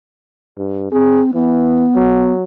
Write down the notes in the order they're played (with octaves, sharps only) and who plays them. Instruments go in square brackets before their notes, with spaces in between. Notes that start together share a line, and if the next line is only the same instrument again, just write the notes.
[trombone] G2
[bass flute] C4 [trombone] G#4
[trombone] E3 [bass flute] B3
[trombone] F#3